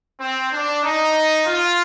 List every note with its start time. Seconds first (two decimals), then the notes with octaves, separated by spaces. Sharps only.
0.20 C4
0.52 D4
0.83 D#4
1.46 F4